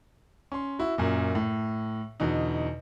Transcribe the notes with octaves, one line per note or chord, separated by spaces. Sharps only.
C#4 C6
E4 F#4
F#2 A#2
A2
E2 B2 D3 D#4